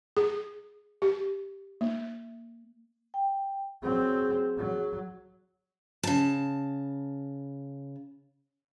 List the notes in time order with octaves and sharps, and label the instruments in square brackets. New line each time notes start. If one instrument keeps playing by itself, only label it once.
[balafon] G#4
G4
A#3
[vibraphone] G5
[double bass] F#3 C4 [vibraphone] G#4
[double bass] F#3
[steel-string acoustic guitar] C#3 A5